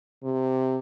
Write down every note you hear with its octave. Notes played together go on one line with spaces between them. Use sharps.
C3